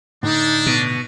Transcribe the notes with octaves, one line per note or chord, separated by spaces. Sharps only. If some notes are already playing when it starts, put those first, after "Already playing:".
A2 D3 D4 D#4
B2